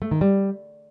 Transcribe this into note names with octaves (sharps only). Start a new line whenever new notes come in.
A3
D#3
G3